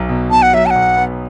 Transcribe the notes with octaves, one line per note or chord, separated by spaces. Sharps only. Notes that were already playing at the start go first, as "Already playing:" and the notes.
Already playing: B1 F#3 B3
B2
B2 A5
F#5
F#3 E5
A5
B1 F#5
B3